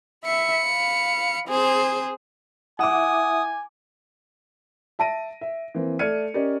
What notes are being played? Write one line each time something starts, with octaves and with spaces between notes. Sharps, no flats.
E5 B5 C#7
F5
C4 G#4 C5
E4 E5 F#5 G#5 D6 D#6
E5 A5 A#6 D7 D#7
E5
E3 A#3 C4
A3 D5 F6 G#6 C#7 D#7
C#4 G4 A#4 D5 D#5